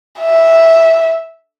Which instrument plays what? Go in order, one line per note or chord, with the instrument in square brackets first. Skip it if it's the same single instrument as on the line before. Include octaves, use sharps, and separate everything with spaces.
[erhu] E5